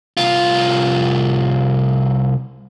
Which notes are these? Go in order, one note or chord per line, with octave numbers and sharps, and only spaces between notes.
C2 F4